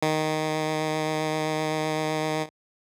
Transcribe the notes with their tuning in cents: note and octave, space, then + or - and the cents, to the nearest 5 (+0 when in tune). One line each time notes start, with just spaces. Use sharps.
D#3 +0